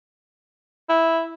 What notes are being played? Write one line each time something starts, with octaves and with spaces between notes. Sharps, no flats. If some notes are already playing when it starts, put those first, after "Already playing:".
E4